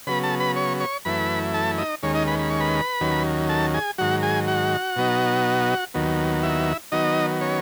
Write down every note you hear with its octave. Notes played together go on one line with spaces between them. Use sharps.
C#3 F#3 B3 B4 B5
A4 A5
B4 B5
C#5 C#6
C#5 C#6
F#2 E3 A3 E4 B4 B5
A4 A5
D#4 D#5
D#2 D#3 G#3 C#4 C#5
D#4 D#5
B4 B5
B5
C#6
B4 B5
D#2 D#3 F#3 C#4
A4 A5
G#4 G#5
G#2 D#3 F#3 F#4 F#5
G#4 G#5
F#4 F#5
B2 F#3 B3 D#4
D#2 D#3 F#3 B3
E4 E5
D#3 F#3 B3 D#4 D#5
C#4 C#5